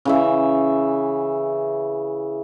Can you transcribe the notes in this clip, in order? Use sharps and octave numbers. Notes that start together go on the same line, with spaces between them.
C#3 E3 E5